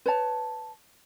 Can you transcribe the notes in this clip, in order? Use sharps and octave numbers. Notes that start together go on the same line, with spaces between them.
B4 C#5 A5